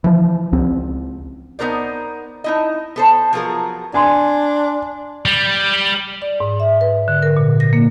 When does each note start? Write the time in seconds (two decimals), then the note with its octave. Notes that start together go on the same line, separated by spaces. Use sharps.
0.04 E3 F3
0.53 C#2 C4
1.59 B3 D#4 A#4 C5 D5
2.44 D#4 E4 D#5
2.96 B3 A4 C5
3.33 F3 F#3 B3 F4 G#4 A#4
3.94 D4 G#5 C6
5.26 G3
6.22 D5
6.40 G#2
6.60 E5
6.81 B4
7.08 D3
7.23 A#4
7.37 A#2
7.60 A#6
7.73 A#3